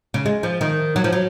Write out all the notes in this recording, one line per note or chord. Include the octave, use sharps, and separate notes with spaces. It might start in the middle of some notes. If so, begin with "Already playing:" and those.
C#3
G#3
F3
D#3
F#3
F3
F#3